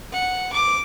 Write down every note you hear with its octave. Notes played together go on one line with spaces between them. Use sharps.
F#5
D6